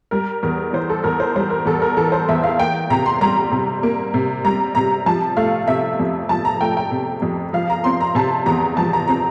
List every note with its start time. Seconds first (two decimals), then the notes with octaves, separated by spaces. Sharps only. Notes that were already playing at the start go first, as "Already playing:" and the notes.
0.11 G3 A#4
0.43 E2 A#4
0.73 E3 C5
0.89 A4
1.04 E2 A#4
1.20 C5
1.36 G3 C5
1.50 A#4
1.66 E2 A4
1.82 A#4
1.97 E3 A4
2.12 C5
2.29 E2 E5
2.43 F5
2.59 A#3 G5
2.90 C3 A#5
3.06 C6
3.21 G3 A#5
3.51 C3
3.83 A#3
4.14 C3
4.45 G3 A#5
4.75 C3 A#5
5.06 F3 A5
5.37 A3 F5
5.67 C3 E5
5.99 F2
6.29 F3 A5
6.45 A#5
6.61 A3 G5
6.77 G5
6.91 C3
7.22 F2
7.53 F3 F5
7.70 A#5
7.84 C4 C6
8.01 A#5
8.15 C3 A5
8.46 E2 A#5
8.77 F3 A5
8.93 A#5
9.08 C4 A#5